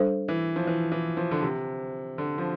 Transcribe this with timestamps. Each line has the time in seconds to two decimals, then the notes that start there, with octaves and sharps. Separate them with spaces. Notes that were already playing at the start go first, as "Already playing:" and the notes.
Already playing: G3 D4 A4 C5
0.28 E3
0.56 F3
0.67 E3
0.92 E3
1.17 F3
1.31 D3
1.42 C3
2.18 D3
2.38 F3